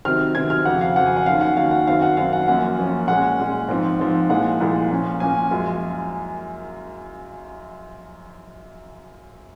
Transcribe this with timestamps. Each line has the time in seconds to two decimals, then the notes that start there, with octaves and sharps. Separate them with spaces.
0.05 C3 D#3 F#3 C4 F6
0.35 C3 D#3 F#3 C4 G#6
0.50 F6
0.65 F2 C#3 F#3 C4 F#5
0.81 F5
0.96 F2 C#3 F#3 C4 F#5
1.06 G#5
1.16 F#5
1.26 D#2 D#3 F#3 C#4 F5
1.41 F#5
1.56 D#2 D#3 F#3 C#4 F5
1.71 F#5
1.87 F#2 D#3 F#3 C4 F5
2.02 F#5
2.17 F#2 D#3 F#3 C4 F5
2.33 F#5
2.47 F#2 F3 A#3 C#4 F#5
2.78 F#2 F3 A#3 C#4
3.08 A#2 G#3 C#4 F#5
3.38 A#2 G#3 C#4
3.68 G#2 F3 C4
3.99 G#2 F3 C4
4.29 C2 A#2 F3 G#3 F#5
4.60 C2 A#2 F3 G#3
4.91 A#2 F3 A#3 C#4
5.20 A#2 F3 A#3 C#4 G#5
5.51 F#2 F3 G#3